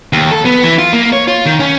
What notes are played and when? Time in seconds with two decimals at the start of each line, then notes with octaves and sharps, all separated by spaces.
0.13 D#2
0.31 A4
0.45 B3
0.63 E3
0.79 F4
0.93 A#3
1.12 C#5
1.28 F4
1.46 D#3
1.60 C#4